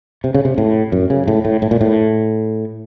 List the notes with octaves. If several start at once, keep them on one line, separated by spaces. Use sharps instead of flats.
C3
C#3
C3
A2
F#2
C#3
A2
A2
A2
A#2
A2